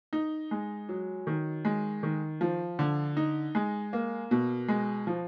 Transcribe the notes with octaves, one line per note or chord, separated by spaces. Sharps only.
D#4
G#3
F#3
D#3
G#3
D#3
F3
D3
D#4
G#3
A#3
B2
G#3
F3